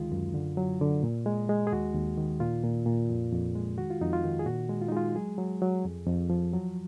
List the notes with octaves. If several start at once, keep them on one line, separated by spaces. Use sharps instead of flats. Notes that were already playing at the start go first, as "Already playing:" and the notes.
Already playing: D2 D#3 G#3 F4
F#2
D3
F#3
D3
A#2
G#3
G#3
G#4
D#2 F#4
D#2
D#3
A#2 F4
A#2
A#2
F2
F2
G#3
D#3 F#4
F4
F2 D#4
F4
D#3
G#4
A#2 F#4
G#3
F4
D#4
G#3 F4
F#3 G#4
F#3
F#3
F2
F2
F3
F#3